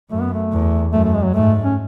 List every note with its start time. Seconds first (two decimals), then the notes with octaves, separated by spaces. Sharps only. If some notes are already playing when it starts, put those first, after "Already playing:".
0.11 F#2 A3
0.22 B3
0.34 A3
0.52 E2
0.93 F#2 A3
1.04 A3
1.14 G#3
1.24 F#3
1.34 G#2 A3
1.64 C#4